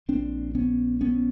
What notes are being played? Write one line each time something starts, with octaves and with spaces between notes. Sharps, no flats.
A#1 A#2 C4 D4
B3 C#4
B3 C#4